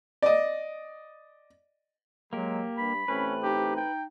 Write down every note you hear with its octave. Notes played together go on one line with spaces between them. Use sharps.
D5 D#5
F#3 G#3 A#3 G4
G2 B5
A1 A3 C4 C#4 B4
D#4 G4
G5